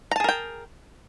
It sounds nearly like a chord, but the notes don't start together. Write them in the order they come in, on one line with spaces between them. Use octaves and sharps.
A#5 A5 G#4 A#4 G5